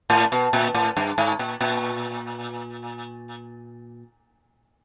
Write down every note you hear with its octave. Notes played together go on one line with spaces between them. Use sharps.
A2
B2
A#2
A2
G2
G#2
A#2
A#2